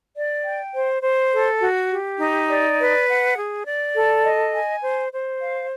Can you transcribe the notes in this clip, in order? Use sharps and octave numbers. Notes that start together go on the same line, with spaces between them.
D5
G5
C5
C5
A4
F#4
G4
D#4
D5
B4
F#5
G#4
D5
A4
D#5
G#5
C5
C5
F5